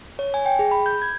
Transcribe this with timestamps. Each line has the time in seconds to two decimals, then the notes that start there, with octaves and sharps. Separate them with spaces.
0.19 C#5
0.34 G#5
0.46 G5
0.59 G#4
0.71 B5
0.86 G6
1.02 G#6